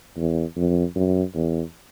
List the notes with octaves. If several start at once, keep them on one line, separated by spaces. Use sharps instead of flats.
E2
F2
F#2
E2